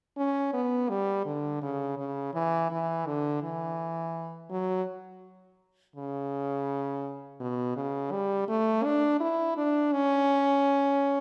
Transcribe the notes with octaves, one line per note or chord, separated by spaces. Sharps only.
C#4
B3
G3
D3
C#3
C#3
E3
E3
D3
E3
F#3
C#3
B2
C#3
G3
A3
D4
E4
D4
C#4